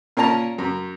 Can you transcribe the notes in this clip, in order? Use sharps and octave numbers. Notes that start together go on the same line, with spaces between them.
A#2 C#4 A#4 A5 A#5
F#2